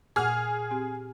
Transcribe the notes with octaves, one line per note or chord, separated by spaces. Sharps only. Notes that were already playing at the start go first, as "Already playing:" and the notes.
A#2 G#4 F#5 F6
C4 G4